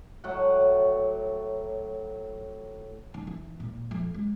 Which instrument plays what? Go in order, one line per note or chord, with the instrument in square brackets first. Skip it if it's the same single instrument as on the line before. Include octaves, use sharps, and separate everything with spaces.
[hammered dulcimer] A2 F#3 D5 F#5
[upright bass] D#3
E3
A#2
F2
G#3